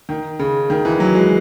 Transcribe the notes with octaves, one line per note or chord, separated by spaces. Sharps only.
D#3
C#3
D#3
E3
F#3
G#3